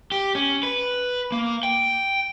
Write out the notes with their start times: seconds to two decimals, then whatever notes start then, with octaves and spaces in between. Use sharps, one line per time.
0.12 G4
0.35 C#4
0.63 B4
1.32 A#3
1.63 G5